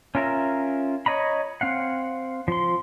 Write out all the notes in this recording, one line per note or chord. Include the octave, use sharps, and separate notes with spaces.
C#4 F4 A#4 E5 A#5
C#5 D#5 A#5 B5
C4 F5 F#5
F3 C6